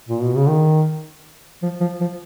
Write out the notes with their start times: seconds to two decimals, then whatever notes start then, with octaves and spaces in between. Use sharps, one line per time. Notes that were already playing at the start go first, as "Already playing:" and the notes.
0.08 A#2
0.22 B2
0.36 C#3
0.49 D#3
1.63 F3
1.81 F3
2.01 F3